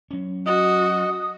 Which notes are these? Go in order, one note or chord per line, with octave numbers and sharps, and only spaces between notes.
F#3 C#4
F#4 D#5 D#6